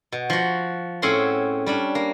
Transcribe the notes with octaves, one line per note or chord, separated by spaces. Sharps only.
B2
F3 F#4
A2 C4 C#4 G#4 F#5 C6
G3 C#4 D4
A#3